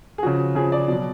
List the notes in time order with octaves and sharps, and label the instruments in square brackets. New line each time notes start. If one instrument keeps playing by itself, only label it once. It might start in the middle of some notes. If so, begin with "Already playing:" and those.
[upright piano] G#4
C#3 F3 F#4
C#3 F3 G#4
D5
B2 F#3